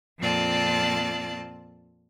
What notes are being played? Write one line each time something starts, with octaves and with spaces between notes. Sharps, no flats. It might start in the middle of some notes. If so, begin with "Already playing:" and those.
F2 A#2 C4 F4 D5 A5